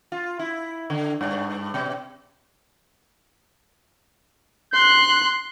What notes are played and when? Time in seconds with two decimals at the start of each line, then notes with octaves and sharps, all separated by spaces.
0.12 F4
0.39 E4
0.90 D3
1.21 G2
1.74 B2
4.74 C6 F#6